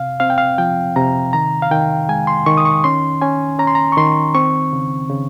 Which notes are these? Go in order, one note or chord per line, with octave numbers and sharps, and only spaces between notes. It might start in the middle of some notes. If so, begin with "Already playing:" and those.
Already playing: C3 F5
C4 F5
G5
F5
F3 G5
C3 A#5
D#3 A#5
F5
D#3 G5
G#3 G#5
C6
D#3 C#6
D#6
C#6
C#4 C6
C#4 G#5
C#4 A#5
C6
A#5
C#6
D#3 C6
C4 C#6
C#3
C#3